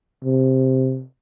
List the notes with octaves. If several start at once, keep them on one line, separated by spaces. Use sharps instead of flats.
C3